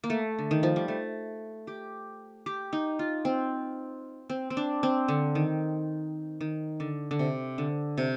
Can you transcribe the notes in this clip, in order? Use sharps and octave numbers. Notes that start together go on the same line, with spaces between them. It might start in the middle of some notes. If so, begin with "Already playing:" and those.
A#3
A3
D3
D#3
F3
G3
A3
G4
G4
D#4
F4
C4
C4
C4
D4
C4
D3
D#3
D#3
D3
D3
C3
D3
C3